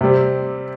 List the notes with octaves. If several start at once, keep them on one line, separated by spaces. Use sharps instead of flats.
C3 G3 C4